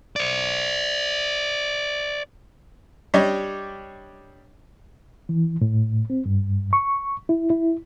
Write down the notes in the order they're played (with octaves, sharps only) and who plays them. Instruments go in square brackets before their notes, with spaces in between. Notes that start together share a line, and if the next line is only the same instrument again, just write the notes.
[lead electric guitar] C5 D5
[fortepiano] G3 D4 G4 C#5 D#5
[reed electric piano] E3
A2
C4
G2
C#6
E4
E4